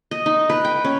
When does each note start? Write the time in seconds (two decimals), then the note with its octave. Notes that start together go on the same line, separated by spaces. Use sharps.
0.11 D#5
0.26 D#4
0.50 B4
0.65 G5
0.85 C#4